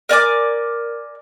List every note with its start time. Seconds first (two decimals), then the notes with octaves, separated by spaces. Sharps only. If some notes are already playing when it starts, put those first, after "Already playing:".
0.09 A#4 D5 G#5 D6